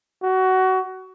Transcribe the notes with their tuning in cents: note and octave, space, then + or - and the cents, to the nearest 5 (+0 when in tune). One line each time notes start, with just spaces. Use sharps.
F#4 +20